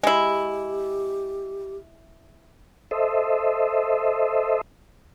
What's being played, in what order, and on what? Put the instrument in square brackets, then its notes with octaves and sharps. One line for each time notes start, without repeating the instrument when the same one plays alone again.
[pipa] G#3 E4 [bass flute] G4
[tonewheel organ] A4 C5 D#5 E5